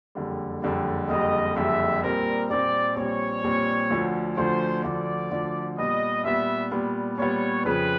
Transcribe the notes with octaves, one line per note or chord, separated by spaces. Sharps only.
F#1 F2 D3 G3
F#1 F2 D3 G3
F#1 F2 D3 G3 D#5
F#1 F2 D3 G3 E5
A#1 A#2 G3 C4 A#4
A#1 A#2 G3 C4 D5
A#1 A#2 G3 C4 C#5
A#1 A#2 G3 C4
D2 D3 F3
D2 D3 F3 C5
D2 D3 F3 D5
D2 D3 F3
A#2 G3 B3 D#5
A#2 G3 B3 E5
A#2 G3 B3
A#2 G3 B3 C#5
F2 C#3 F3 B4